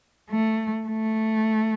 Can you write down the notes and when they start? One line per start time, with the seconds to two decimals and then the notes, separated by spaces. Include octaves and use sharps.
0.31 A3
0.88 A3